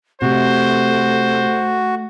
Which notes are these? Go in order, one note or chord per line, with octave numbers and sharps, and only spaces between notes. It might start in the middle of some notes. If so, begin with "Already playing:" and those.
C3 A3 F#4 C5